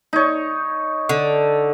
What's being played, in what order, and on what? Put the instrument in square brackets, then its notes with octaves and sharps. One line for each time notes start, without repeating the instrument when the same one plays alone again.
[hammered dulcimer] D#4 C#5
[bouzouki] D3